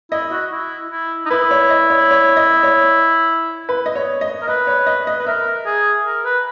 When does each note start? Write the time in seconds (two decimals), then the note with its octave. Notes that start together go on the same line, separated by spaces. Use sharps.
0.12 E4 D#5
0.32 F#4
0.52 E4
0.91 E4
1.26 D#4
1.30 E4 B4
1.51 C#5
1.70 D#5
1.90 C#5
2.11 C#5
2.37 D#5
2.63 C#5
3.69 B4
3.86 D#5
3.95 C#5
4.21 D#5
4.42 A#4
4.48 B4 D#5
4.67 C#5
4.87 D#5
5.07 D#5
5.19 B4
5.26 A#4 E5
5.66 G#4
6.06 A#4
6.25 B4